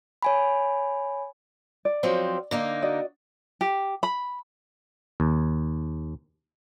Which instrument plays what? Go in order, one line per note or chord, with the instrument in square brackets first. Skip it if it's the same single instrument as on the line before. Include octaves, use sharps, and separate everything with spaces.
[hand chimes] C#5 G#5 B5
[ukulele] D5
[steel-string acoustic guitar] F3 F#3 C4
D3 A#3 D#4
[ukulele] F#4 D5 D#5
G4
B5
[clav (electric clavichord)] D#2